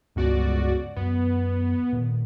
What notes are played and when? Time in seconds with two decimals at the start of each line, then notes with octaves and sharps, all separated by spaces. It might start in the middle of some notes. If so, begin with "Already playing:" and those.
0.16 C#2 G2 B3 C#4 F#4 D5
0.96 F#2 B3
1.93 A#2 D#3